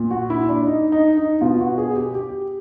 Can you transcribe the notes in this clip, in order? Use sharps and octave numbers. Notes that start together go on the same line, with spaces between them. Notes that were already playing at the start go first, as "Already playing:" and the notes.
Already playing: A#2
F#4
E4
D4
D#4
D#4
D#4
B2 F4
F#4
G#4
G4
G4